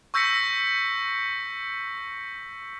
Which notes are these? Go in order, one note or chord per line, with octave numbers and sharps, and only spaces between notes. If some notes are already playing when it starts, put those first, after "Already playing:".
C#6 E6 G6 A#6 B6 C#7